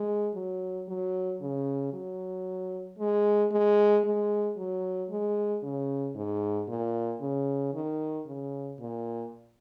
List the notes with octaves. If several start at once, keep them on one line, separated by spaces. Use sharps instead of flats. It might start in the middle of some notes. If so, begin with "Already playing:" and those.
Already playing: G#3
F#3
F#3
C#3
F#3
G#3
G#3
G#3
F#3
G#3
C#3
G#2
A#2
C#3
D#3
C#3
A#2